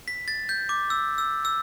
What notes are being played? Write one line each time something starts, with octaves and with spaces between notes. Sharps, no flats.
B6
A6
G6
D6
E6
E6
E6